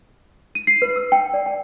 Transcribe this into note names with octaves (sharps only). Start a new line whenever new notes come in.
D#7
C7
B4
E6
G5
D5
G5